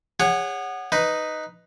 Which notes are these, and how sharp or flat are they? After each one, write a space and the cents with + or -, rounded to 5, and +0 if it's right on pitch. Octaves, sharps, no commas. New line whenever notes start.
G#4 -35 C#5 +0 F#5 +0
D#4 +0 B4 +5